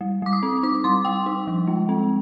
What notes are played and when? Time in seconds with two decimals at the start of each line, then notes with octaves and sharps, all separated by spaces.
0.01 G3
0.22 G3 D6
0.33 D#6
0.43 C4
0.63 D#4 D6
0.84 G3 C6
1.05 G3 G5
1.26 D#4
1.47 F3
1.67 G#3
1.89 C4